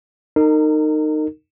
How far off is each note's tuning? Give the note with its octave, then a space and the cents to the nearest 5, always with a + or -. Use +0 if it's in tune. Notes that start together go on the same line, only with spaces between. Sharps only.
D#4 -15 A#4 -35